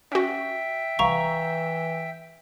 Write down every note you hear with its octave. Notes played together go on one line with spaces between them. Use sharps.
C#4 F#4 E5 G5
C2 E3 F5 A#5 C#6